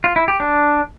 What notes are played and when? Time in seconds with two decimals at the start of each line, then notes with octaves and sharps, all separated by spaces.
0.04 F4
0.16 E4
0.28 G4
0.40 D4